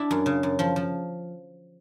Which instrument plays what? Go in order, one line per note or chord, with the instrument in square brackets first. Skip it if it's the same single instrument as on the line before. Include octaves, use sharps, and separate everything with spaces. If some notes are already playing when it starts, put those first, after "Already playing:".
Already playing: [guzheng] D4 E4
F#2
C#3
F#2
F3
F3